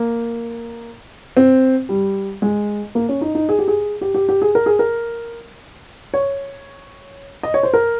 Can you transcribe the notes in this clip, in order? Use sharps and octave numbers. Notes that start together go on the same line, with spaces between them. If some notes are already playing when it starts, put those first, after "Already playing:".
Already playing: A#3
C4
G3
G#3
A#3
C#4
D#4
D#4
G#4
G4
G#4
G4
G4
G4
G#4
A#4
G#4
A#4
C#5
D#5
C#5
C5
A#4